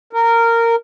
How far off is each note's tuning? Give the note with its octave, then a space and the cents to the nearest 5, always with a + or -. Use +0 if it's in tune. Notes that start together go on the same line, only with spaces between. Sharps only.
A#4 -15